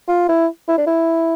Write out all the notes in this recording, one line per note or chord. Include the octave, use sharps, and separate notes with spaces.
F4
E4
E4
D4
E4